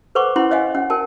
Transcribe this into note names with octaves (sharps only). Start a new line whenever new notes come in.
A4 B4 C5 F#5 C#6 D6
C#4 E4 F#5 B5 C6
C#5 D#5 F5 F#5 G#5
C#4 F#5
A#4 G5 A5